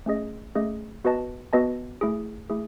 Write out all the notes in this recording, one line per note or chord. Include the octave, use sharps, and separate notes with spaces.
A3 C#4 G#4 D#5
A3 C#4 G#4 D#5
B3 F#4 B4 D#5 A5
B3 F#4 B4 D#5 A5
A3 E4 G#4
A3 E4 G#4